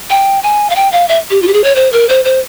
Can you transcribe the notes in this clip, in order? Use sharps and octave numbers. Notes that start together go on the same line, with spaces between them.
G5
G#5
F5
G5
F5
E5
G4
F4
G4
G#4
C#5
C5
A#4
C5
C5